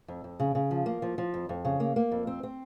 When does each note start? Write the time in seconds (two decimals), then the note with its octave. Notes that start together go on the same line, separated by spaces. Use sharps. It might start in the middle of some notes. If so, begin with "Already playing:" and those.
0.08 F2
0.24 F2
0.40 C#3
0.55 C#3
0.71 F3
0.86 A#3
1.02 F3
1.18 F3
1.34 F2
1.49 F2
1.65 C#3
1.80 A#3
1.96 A#3
2.11 F2
2.27 C4
2.43 C4